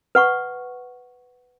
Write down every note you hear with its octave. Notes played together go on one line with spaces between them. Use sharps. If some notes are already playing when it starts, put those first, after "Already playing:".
B4 F#5 C#6